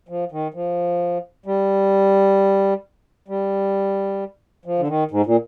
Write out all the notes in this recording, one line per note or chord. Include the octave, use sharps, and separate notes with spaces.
F3
D#3
F3
G3
G3
F3
D3
D#3
G#2
A#2